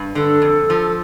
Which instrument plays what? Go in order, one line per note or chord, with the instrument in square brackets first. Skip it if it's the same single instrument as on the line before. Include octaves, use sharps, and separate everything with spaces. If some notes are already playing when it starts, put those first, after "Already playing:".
Already playing: [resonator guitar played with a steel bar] G2
[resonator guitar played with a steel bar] D3 [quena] A4
[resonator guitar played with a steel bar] F2
F3